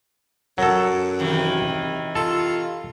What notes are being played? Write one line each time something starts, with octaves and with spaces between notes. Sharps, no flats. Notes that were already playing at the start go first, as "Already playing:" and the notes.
F#2 F#3 A4
C3 D#3 E3
F4 A4